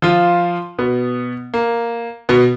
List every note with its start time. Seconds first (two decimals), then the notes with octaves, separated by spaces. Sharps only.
0.02 F3 F4
0.78 B2 B3
1.54 A#3
2.29 B2 B3